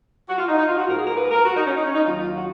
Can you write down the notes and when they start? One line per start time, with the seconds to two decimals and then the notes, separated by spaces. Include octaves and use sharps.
0.28 F#4
0.38 F4
0.48 D#4
0.58 D#4
0.68 F4
0.77 F#4
0.87 G#2 F3 A#3 A#4
0.96 G#4
1.07 A#4
1.16 B4
1.31 A#4
1.45 F#4
1.56 D#4
1.66 C#4
1.75 D#4
1.85 C#4
1.94 D#4
2.05 D#2 D#3 F#3 A#3 F4
2.19 F4
2.34 F#4